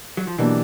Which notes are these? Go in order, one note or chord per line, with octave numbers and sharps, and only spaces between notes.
F#3
F3
B2 E3 F#3 A#3 D4 G4